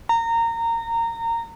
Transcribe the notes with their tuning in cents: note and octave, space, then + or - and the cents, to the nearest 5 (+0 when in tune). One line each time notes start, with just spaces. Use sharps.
A#5 -20